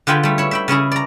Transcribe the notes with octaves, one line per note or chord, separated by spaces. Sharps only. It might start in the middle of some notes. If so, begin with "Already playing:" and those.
D3 F4 G4 G5 G#5 B5
G3 A3
E4 C#5
E5 G5 B5
C#3 C#4 E4 G#4
D5 A#5